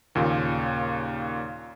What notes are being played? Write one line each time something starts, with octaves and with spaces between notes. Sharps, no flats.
D#2 A#2 C#3 F4